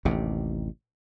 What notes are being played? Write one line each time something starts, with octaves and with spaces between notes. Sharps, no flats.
A1 D#2 C3